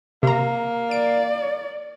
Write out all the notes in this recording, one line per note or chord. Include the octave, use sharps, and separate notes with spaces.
C3 A#3 A#5
D5 D7